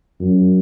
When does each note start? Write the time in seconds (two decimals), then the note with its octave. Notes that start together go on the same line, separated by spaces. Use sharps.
0.20 F#2